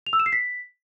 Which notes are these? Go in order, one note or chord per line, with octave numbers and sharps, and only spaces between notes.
F7
E6
E7
C7
B6